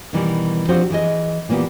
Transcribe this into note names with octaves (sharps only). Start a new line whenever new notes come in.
B2 D#3 E3 G3
F3 C4 D4 F#4 G4 C5
E3 G#4 D#5
A#2 E3 A#3 B3 G4